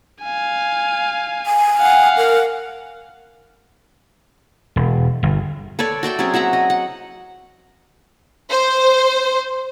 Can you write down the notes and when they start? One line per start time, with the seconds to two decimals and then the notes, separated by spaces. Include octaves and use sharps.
0.23 F5 G#5
1.46 G#5
1.78 F5 F#5
2.17 A#4
4.76 E1
5.23 G1
5.79 A4 B4 C#5 D5
6.03 F#4 D5 E5 G5
6.19 F#3 C4 C#4 G#4
6.34 F#4 E5 F#5 A#5
6.53 D#5
6.70 F#5
8.50 C5